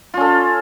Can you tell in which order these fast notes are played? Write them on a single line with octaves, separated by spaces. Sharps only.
F4 C#4 A4